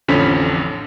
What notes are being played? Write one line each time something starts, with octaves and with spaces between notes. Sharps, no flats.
A1 F2 D3 F3 C#4 B6